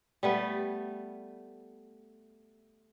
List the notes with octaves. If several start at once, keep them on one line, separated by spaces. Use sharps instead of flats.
G3 A3 B3